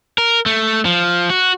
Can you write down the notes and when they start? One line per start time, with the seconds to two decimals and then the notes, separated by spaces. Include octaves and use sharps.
0.18 A#4
0.46 A3
0.85 F3
1.30 F#4